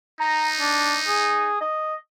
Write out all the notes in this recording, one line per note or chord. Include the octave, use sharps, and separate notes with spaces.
D#4 A#5
D4
G#4
D#5